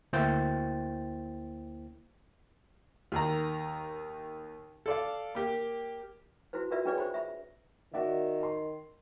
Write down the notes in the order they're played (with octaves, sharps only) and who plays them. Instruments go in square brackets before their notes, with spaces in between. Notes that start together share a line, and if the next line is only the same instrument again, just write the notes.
[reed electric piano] D2 A#3 E4 C5 G5 A6
[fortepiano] D#2 D#3 A#5
A4 D5 F5
A#3 G4
[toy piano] E4 F#4 B4 C5
F4 F#4 A#4 B4 D5 E5
C#4 D4 G#4 B4 C#5 D5
G4 C5 B5
E5 B5
[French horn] D#3 [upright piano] F#4 D5 E5
[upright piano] C6